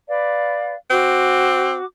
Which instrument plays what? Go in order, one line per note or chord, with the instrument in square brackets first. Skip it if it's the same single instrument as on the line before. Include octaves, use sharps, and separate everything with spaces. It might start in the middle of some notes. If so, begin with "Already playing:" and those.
[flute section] B4 D5 F5
[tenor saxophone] C4 [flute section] F#4 D6